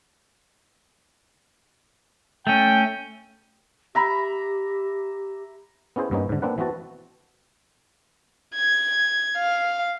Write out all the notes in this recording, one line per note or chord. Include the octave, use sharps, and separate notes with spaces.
A3 C#4 G5
G4 E5 A#5 B5
B3 C#4 E4 G#4 C5
G2 A#3 B3 C#4 D#4
G#2 D3
A#3 C4 D4 B4 F#5
E3 B3 C4 F#4 A5
G#6
F5